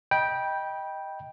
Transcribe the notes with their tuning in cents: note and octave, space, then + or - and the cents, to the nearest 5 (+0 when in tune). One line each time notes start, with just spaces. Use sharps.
D#5 +5 G5 +0 B5 -25